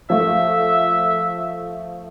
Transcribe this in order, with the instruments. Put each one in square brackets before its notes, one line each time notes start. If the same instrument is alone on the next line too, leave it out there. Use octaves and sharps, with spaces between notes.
[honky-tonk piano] F3 A3 [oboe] E5